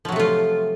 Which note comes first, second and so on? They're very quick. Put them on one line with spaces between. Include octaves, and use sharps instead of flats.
F3 F#3 C3 A3 F4